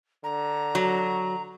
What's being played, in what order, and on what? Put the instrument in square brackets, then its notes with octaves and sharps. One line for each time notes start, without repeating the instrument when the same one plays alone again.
[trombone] D3 [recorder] A#5
[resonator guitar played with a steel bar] F#3